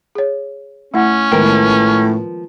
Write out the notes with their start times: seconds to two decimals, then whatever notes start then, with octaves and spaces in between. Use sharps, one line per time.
0.15 G#4 C#5
0.94 A3 C#4 E4 F#5
1.32 A2 D#3 F3 G#3 B3 A#4 G5